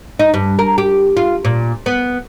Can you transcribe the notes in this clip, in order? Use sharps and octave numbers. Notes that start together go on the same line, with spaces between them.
D#4
G2
A#4
G4
F4
A#2
B3